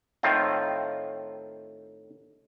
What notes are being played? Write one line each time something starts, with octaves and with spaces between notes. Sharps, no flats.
A2 D#3 C4 F4